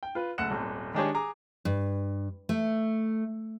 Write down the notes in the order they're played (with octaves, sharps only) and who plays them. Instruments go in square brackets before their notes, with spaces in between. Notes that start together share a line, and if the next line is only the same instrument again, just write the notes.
[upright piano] G5
F4 B4
F#1 A3 F#5 F#6 C#7 E7
D#1 G#1
D#3 G#3 D4 G4 G#4 C#5
G#4 A#5 D6
[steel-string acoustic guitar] G2
A3